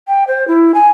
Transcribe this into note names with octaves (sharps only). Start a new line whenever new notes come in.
G5
C5
E4
G#5